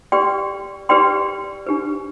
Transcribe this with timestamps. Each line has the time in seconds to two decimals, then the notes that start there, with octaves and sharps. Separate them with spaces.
0.12 G4 B4 D5 G5 C6
0.89 G4 B4 D5 G5 C6
1.66 D4 G4 B4